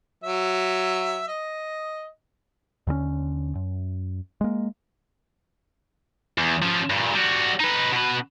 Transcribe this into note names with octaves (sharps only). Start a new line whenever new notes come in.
F#3 E5
D#5
D#2 D3 G#3 C#4
F#2
G#3 A#3
E2
F3 C#4
G2 A#2
G3 F#4
D#4 B4
B2 B4